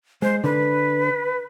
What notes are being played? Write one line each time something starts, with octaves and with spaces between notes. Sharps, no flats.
G#3 C5
D3 B4